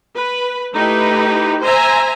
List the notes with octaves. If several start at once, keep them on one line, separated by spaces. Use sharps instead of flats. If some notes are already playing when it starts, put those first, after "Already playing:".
B4
A3 D#4 E4 G4 B4
C5 E5 G#5 A#5